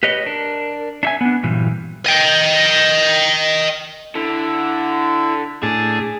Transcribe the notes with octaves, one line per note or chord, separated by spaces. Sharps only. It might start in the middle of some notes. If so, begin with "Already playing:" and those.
G4 B4 C#5 D#5
D4 A#4
D4 E5 G#5
B3 D4
G2 A#2 E3 F#3 G3
D#5 G5
D3 E4
A2 D4 G#4 A5